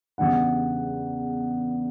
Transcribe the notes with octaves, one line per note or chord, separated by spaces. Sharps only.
E2 C#3 G3 D4 F#5